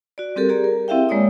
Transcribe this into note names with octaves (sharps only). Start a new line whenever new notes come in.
F#4 D5
G3 C4 G4 A4 A#4
G4 G#4 D5 A#5
A#4
C4 E4 G4 E5 F5 G5
G#3 A#3 C#5 D5 D#6